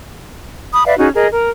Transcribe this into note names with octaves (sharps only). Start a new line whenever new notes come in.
B5 D#6
B4 D5 E5 F5
C#4 D#4 F#4 G#4
G#4 A#4 D#5
A#4